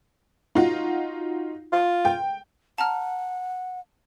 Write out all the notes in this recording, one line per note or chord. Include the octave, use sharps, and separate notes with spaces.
D#4 F4 F#4
F4
G5
F#5 A5 A#5 F6